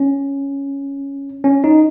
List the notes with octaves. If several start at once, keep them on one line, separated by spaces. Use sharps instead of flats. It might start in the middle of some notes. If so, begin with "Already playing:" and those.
Already playing: C#4
C#4
D#4